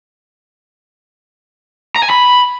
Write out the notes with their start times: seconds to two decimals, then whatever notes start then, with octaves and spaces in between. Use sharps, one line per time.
1.96 A#5
2.03 G#5
2.10 B5